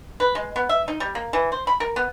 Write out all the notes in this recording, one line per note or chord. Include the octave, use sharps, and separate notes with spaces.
B4
G#3
B3
E5
D#4
G3
A#3
E3
C5
B5
A#4
B3